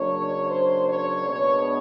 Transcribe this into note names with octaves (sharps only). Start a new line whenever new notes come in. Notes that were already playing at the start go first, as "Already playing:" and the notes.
Already playing: C#3 F#3 A#3 D4 C#5
C5
C#5
B2 G#3 B3 D4 C#5